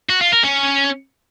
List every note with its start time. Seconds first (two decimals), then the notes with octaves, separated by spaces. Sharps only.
0.09 F#4
0.21 F4
0.32 A#4
0.44 C#4